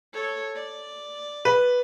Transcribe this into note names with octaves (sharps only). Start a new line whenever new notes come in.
A4 C#5
D5
B4